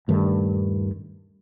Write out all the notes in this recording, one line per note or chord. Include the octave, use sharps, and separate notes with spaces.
D#1 G2 D#3 A3